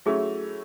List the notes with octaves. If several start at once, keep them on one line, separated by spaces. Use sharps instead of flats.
F#3 A3 C#4 E4 G#4